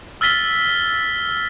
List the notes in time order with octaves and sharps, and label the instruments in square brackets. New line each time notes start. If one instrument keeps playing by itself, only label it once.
[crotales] E6 F6 A6 B6 G7